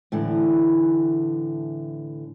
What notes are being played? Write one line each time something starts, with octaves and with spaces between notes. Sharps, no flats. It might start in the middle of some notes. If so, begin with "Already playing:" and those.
A2 D3 E3